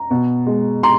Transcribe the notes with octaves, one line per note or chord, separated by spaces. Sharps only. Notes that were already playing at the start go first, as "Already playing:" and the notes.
Already playing: A#5
B2
G#3
A#5 C6